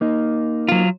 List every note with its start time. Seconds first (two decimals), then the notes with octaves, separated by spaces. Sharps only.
0.01 A#3 D#4
0.69 F#3 F4